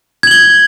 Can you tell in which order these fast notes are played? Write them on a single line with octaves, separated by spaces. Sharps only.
G#6 F#7 G7